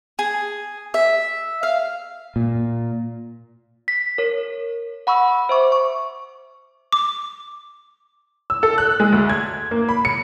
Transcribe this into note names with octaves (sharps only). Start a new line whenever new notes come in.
G#4
E5
F5
A#2
B6
A#4 C#5
F#5 B5 C#6 E6
C5 E5 C#6 D6
C#6
D6
E6
A4
F#6
G#3
D2
G#6
A#3
B5
C#7